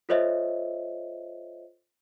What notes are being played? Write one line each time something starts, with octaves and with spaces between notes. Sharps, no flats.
F4 A4 C5 C#5 D#5 E5